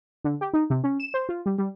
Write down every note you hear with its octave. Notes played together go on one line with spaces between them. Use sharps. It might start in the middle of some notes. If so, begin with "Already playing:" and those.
D3
G4
D#4
C3
C#4
E7
C5
F4
G3
G3